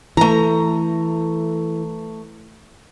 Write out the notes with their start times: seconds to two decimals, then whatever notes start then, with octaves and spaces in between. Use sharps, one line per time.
0.17 E3 A3 A#5